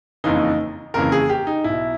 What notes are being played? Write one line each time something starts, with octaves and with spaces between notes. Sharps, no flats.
F#1 F2 C#3 E3 D#4
F#1 F2 C#3 E3 A#4
G#4
G4
D#4
B1 B2 E4